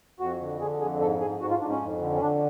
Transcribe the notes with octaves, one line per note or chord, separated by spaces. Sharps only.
F2 F#4
D3
D3 G#4
F2 G#4
G#2 A4
G#2 G#4
G#2 F#4
F4
G#2 D4
C#4
F2
D3
C#4
D3 D4